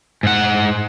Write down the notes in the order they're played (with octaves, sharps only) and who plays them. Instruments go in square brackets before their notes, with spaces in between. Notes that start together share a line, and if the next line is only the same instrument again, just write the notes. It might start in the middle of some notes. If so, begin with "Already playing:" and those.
[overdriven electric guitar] G#2 F#5